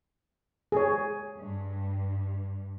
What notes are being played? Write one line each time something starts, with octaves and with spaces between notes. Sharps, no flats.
G#4 C#5
G2